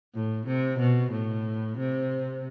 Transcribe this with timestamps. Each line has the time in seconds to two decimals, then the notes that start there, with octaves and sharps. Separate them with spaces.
0.14 A2
0.46 C3
0.79 B2
1.11 A2
1.77 C3